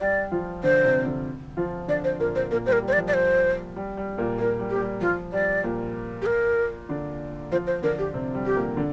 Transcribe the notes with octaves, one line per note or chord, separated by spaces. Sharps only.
G3 G4 D5
F3 F4
D3 D4 C5
C3 C4
D3 D4
F3 F4
D3 D4 D5
C5
A#2 A#3 A#4
C5
A#2 A#3 A#4
G3 C5
A#4
G3
C5
D5
F3
D5
C5
G3
G3
A#2 A#3
A#2 A#3 A#4
G3
A#3 G4
G3
F3 F4
G3 D5
A#2 A#3
G4
A#4
D3 D4
F3 F4 C5
C5
D3 D4 A#4
G4
C3 C4
G3
G4
A#2 A#3
D3 D4